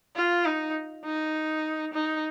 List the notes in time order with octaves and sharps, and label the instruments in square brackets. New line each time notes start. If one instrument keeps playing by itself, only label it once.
[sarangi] F4
D#4
D#4
D#4